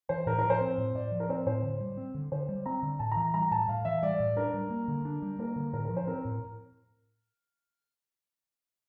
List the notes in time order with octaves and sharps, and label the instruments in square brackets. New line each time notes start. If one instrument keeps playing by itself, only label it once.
[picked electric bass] E3 [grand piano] C5
[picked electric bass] A2 [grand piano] A#4
[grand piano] A#4
[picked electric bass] F3
[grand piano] C5
[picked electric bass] C4
A2
[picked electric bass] A2 [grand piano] D5
[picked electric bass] F3
[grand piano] A#4
[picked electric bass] C4 [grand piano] C5
[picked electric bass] A2 [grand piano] C5
[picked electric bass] D3
G3
C4
D3
[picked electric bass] D3 [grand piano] C5
[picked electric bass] G3
[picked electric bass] C4 [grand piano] A#5
[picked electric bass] D3
[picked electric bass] A2 [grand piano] A5
[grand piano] A#5
[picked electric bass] E3
[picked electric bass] G3 [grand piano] A#5
[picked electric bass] A2 [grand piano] A5
[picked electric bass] A2 [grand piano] F5
[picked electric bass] E3 [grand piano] E5
[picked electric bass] G3 [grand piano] D5
[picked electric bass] A2
[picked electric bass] D4 [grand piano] A#4
[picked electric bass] G3
A#3
D3
D4
G3
[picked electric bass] A#3 [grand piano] A#4
[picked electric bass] D3
[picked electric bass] A2 [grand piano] A#4
[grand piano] A#4
[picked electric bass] F3
[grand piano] C5
[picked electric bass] C4 [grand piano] A#4
[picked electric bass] A2